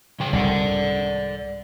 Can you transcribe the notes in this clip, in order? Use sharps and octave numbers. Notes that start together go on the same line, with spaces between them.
C#3 G5
C2 G#2 D5 F#5